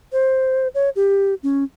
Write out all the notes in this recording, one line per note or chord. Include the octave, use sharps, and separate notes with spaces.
C5
C#5
G4
C#4